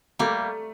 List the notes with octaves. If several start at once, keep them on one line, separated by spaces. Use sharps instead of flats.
G3 A3 A#3